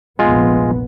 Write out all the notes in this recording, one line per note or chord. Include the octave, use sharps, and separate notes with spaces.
F1 A#1 G#3 B3 F4